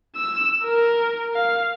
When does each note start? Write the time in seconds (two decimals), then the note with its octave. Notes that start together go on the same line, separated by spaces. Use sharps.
0.16 E6
0.64 A#4
1.34 F5